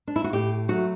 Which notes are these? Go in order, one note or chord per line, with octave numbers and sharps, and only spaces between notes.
D4
E4
F#4
A2 G4
F#3 A3 F#4